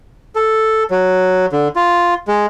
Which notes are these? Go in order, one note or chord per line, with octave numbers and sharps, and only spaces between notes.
A4
F#3
D3
F4
G#3